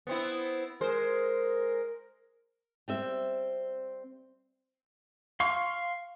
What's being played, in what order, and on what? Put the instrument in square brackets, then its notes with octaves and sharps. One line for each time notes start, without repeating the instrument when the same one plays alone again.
[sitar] B3 C4 E4
[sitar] G#3 C5 [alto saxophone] A#4
[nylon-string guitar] G3 C4 E5
[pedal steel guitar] F5 C6 C#6